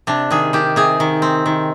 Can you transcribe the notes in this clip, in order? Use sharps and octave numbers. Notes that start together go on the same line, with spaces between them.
C3 D4
D#3 G#4
D#3 G4
C3 G#4
D#3
C4
D#3